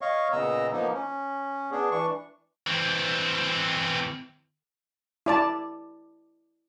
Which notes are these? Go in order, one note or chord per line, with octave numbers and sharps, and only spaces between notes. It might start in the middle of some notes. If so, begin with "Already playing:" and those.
C#5 D#5 F5 C#6
A#2 C#3 B3 D#5 A#5 E6
F3 A#3 B3 D#4
C#4
B3 D4 G#4
E3 D4 C#6
E3 C4
E4 D5 A5